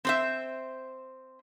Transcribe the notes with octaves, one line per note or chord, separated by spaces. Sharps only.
C4 C5 E5